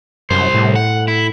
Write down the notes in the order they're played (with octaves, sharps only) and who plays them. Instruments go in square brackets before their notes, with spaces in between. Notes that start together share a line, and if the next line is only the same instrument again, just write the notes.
[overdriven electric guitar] C2 C5 [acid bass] F#2
[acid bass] A2
[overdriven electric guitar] F#5
E4